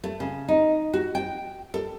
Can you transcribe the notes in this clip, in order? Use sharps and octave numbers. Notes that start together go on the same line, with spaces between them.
A3
C#3
D#4
F#4
G5
A4